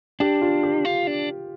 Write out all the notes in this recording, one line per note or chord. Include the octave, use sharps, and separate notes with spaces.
D4 G4
F4
G4
F4
D4